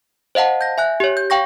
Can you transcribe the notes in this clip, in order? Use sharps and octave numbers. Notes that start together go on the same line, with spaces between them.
C5 D#5 F5 F#5 A5
G6 A#6
E5 G#5 F#6
G4 C#5
G6
F5 G5 C#6 A#6